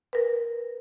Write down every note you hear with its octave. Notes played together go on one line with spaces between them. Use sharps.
A#4 B4